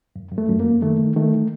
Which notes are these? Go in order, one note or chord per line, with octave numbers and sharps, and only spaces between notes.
F#2
F#2
A3
F#2
A#3
F#2
D#3 A3
D#3
D#3 A3